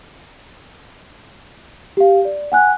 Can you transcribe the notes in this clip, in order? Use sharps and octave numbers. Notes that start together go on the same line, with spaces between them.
G4 F5
D5
F#5 G#5 F#6